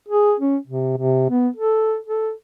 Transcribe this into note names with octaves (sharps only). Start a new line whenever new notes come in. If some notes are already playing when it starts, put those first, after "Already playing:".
G#4
C#4
C3
C3
B3
A4
A4